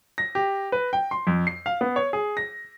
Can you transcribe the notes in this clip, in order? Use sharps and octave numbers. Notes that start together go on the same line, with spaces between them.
A#6
G4
B4
G5
C6
F2
C7
F5
B3
C#5
G#4
A#6